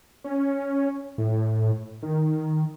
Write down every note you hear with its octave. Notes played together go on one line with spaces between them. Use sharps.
C#4
A2
D#3